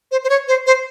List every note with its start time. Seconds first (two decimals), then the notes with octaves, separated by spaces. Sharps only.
0.12 C5
0.24 C5
0.30 C#5
0.48 C5
0.66 C5